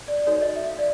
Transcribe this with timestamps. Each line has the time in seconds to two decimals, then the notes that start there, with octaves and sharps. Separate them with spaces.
0.08 D5
0.27 D#4 F#4 A4 C#5 D5
0.42 D#5
0.56 E5
0.69 F5
0.79 D5